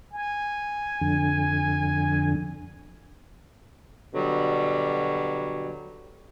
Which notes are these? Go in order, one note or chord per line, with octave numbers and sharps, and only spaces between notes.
G#5
F2 D3
B2 D3 F#3 G3